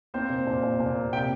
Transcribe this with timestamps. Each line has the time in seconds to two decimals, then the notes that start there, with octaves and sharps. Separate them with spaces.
0.14 A#3 C4 C5
0.30 A#2
0.47 A#2
0.63 A#2
0.80 A#2
0.96 A#3
1.12 C3 G4 G5